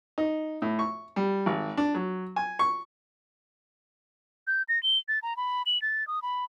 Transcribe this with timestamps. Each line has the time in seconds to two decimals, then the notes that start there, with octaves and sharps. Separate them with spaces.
0.18 D#4
0.62 A2
0.79 C#6
1.16 G3
1.46 G#1
1.77 D4
1.95 F#3
2.36 G#5
2.59 C#6
4.47 G6
4.69 A#6
4.83 G7
5.08 A6
5.22 A#5
5.37 B5
5.66 F#7
5.82 A6
6.07 D#6
6.22 B5